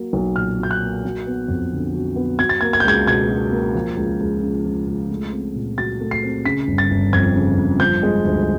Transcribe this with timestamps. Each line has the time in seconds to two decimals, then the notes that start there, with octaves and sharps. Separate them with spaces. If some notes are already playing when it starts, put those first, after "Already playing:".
Already playing: F#3 A#3
0.13 B1
0.36 A#2 F6
0.59 F#3 G6
0.71 F#6
0.81 A#3
1.04 F#3
1.27 B3
1.48 F2
1.72 D3
1.95 F#3
2.16 B3
2.39 F#3 G#6
2.49 A6
2.61 A#3 G#6
2.73 G#6
2.80 G6
2.85 C#2 G#6
3.06 B2 G#6
3.29 F#3
3.51 A#3
3.75 F3
3.96 C#2
4.20 C#2
4.42 C#3
4.65 F3
4.87 C#2
5.10 A3
5.32 C4
5.55 A#2
5.77 F#3 A6
6.01 A3
6.11 C7
6.23 C4
6.45 C#3 B6
6.68 G1
6.78 A6
6.90 G1
7.13 F2 G#6
7.36 C#3
7.57 G1
7.80 F3 G6
8.03 G#3
8.25 D2